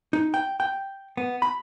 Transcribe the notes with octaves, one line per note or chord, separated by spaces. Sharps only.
D#4
G5
G5
B3
B5